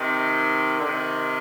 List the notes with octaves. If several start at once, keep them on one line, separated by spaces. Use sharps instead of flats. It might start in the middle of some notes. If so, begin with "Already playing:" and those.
Already playing: C3 D#3
D3
C3 D#3